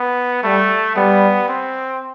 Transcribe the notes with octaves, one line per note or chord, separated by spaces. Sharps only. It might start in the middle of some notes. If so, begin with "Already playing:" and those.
Already playing: B3
G3 A3
G3 B3
C4